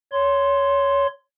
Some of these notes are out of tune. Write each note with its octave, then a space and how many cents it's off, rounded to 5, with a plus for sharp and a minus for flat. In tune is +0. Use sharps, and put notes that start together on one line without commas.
C#5 +15 C6 +0